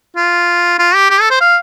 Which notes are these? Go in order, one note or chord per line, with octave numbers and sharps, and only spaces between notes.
F4
F4
G4
G4
A4
C5
F5